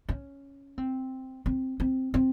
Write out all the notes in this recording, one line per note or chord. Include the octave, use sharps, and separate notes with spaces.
C#4
C4
C4
C4
C4